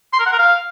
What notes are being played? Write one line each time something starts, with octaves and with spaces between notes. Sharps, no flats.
C6
A#4
F#5
A#4
F5